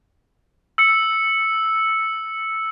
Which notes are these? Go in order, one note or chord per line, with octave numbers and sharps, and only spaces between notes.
E6 C#7